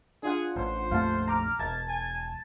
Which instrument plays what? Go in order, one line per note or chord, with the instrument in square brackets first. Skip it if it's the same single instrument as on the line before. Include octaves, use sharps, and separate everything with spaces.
[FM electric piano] D4 F4 F#5 [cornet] G#4
[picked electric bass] A1 [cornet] C5
[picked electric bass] A#1 F2 A3 [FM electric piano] F5 F#5 A5
[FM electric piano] A#5 D6 F6
[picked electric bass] E1 [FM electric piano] A5 G#6 A6
[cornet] G#5